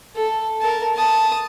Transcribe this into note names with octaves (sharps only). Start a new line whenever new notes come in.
A4
A#4 A5
A5 D#6